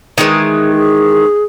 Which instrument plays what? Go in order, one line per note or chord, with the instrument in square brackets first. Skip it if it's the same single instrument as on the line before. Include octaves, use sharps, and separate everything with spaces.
[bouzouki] D#3 E3 G#3
[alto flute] G#4